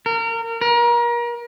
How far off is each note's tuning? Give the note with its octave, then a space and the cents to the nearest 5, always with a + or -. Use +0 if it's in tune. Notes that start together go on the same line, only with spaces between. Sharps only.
A#4 -30
A#4 +35